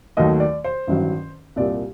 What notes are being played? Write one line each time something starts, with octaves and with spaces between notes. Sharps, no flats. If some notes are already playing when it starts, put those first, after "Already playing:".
D#2 D#3 F#3 A3 D#5
D5
C5
A1 G2 D#3 F#3
C2 A#2 G3 D5